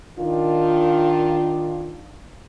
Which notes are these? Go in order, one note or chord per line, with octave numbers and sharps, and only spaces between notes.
D#3 D4 F4